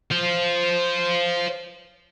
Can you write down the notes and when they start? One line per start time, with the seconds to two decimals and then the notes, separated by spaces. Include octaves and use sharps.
0.11 C5 F5